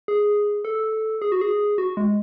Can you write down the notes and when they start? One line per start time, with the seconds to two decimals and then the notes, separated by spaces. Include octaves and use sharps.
0.08 G#4
0.65 A4
1.22 G#4
1.32 F#4
1.41 G#4
1.78 F#4
1.97 G#3